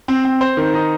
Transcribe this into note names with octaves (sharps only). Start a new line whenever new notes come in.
C4
C4
C5
D#3
D#4